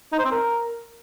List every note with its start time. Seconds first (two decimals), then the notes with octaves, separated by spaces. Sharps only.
0.12 D#4
0.19 C5
0.25 C4
0.31 A#4